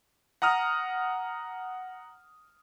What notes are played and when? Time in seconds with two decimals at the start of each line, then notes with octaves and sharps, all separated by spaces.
0.42 F#5 A#5 D#6 F6